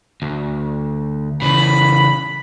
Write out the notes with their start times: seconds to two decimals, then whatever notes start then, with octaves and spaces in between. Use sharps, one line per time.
0.22 D2
1.42 C#3 E3 B5